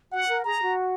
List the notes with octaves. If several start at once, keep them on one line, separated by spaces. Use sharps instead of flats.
F#4 F#5
A#4
G#4 A#5
F#4